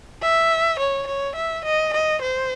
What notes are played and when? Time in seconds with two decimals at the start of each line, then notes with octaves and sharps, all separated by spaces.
0.22 E5
0.79 C#5
1.07 C#5
1.35 E5
1.64 D#5
1.93 D#5
2.21 C5